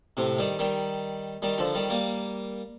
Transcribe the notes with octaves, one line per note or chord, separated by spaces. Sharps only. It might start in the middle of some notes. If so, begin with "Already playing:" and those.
A2 C3
D#3 G3
D#3 G3
D#3 G3
D3 F3
D#3 G3
G3 A#3